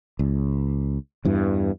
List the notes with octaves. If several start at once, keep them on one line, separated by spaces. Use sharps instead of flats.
C#2
E2 G2 E3